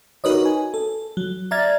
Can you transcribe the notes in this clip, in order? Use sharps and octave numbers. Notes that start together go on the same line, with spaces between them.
D#4 F#4 A#4 B4 C#5 D#5
G#5
A4
F#3
D5 E5 A#5 F6 G#6 A6